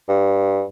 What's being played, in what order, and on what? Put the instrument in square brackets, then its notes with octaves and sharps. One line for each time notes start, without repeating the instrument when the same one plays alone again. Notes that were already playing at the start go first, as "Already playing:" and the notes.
[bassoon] G2